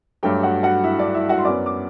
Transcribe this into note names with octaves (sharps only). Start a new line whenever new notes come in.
G2 F#3 A3 G4 G5
F#4 F#5
F#4 F#5
E4 E5
D4 D5
E4 E5
F#4 F#5
C6
F#2 F#3 B3 D5 D6
D6